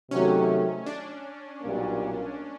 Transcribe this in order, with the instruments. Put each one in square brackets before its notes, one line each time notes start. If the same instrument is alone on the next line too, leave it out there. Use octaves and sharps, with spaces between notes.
[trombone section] C3 D#3 F#3 A3 [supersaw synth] C#4
[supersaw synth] D4
[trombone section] B1 A#2 G3 A#3